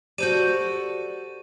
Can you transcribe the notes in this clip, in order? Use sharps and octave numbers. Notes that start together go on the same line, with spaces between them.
F#4 G4 A4 C5 D5 G6 D#7